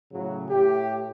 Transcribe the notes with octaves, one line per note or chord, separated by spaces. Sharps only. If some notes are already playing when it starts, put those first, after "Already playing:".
A2 C#3 F#3
A2 G4